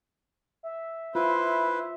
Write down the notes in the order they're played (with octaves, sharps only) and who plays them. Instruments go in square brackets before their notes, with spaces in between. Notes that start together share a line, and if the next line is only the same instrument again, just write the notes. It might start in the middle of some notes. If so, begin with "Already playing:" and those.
[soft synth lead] E5
[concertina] E4 B4 [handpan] F4 [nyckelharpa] C5